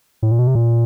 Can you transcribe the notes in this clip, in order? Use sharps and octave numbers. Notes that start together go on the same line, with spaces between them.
A2
A#2
B2
C3
A#2